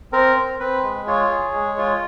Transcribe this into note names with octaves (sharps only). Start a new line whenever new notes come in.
C4 A#4
C4
C4 B4
G#3
F4 C#5
G#4
G#3
F4